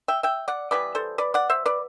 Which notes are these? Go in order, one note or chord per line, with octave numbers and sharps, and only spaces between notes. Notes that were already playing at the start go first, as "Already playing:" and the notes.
E5 G5
E5 G5
D5 F#5
E3 G3 B3 B4 D5
A4 C5
B4 D5
D5 F#5
C5 E5
B4 D5